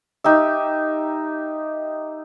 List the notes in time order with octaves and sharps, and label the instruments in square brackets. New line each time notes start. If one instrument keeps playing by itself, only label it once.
[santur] D#4 G4 E5